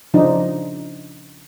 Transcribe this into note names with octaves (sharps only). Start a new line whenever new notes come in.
C#3 F3 D4 D#4